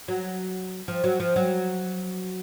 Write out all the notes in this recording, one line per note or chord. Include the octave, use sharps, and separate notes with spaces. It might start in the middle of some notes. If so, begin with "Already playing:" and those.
F#3
F3
F#3
F3
F#3